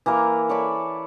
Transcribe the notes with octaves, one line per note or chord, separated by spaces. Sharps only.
E3 A#3 A#4 A#5
C#5 D5 A5 B5